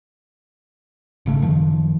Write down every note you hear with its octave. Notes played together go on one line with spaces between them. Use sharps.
G#1 C#3 A3
F#2 D#3 F3